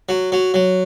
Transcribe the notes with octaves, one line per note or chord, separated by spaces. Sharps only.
F#3
F#3
F#3